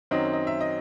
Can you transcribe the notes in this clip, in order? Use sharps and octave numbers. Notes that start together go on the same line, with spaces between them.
F#2 D#3 F#3 C4 D#5
D#5
E5
D#5